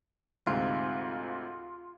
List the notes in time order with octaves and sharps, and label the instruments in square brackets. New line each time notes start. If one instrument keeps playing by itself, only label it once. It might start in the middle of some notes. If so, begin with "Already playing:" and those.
[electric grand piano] D2 G#2 C3 [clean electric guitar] F4